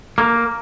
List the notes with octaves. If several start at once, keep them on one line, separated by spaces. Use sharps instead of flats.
A#3